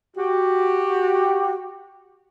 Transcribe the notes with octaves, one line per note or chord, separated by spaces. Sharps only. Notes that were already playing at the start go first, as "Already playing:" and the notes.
F#4 G4